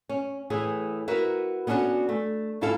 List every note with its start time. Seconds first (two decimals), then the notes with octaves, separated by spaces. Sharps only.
0.09 C#4
0.50 A2 E3 G#4
1.08 E4 F#4 A#4 B4
1.67 B3 C#4 D4 F4 F#4 A4
2.09 A3
2.61 D2 G#2 E4 F4 A4 F5